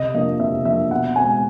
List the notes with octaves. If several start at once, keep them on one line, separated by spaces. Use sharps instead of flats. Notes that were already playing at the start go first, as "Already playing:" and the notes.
Already playing: C3 D#5
F3 A#3 D4 D#5
C3 E5
F3 A#3 D4 E5
B2 F#5
G#3 C4 G#5